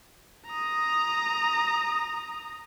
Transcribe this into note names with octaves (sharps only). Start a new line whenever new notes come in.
A#5 D#6